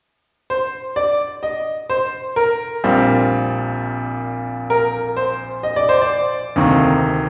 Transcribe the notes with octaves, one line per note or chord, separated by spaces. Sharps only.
C5
D5
D#5
C5
A#4
A#1 A#2 G3 C4 F4
A#4
C5
D#5
D5
C5
D5
D2 C3 D#3 A#3